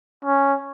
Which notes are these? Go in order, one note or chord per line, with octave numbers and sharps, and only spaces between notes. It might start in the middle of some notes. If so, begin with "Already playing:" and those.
C#4